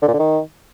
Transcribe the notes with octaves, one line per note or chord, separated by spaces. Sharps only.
D3
A#2
D3
D#3